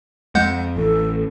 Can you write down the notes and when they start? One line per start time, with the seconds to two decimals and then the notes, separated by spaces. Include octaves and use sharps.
0.35 F2 G#3 F#5 G6
0.76 A1 A4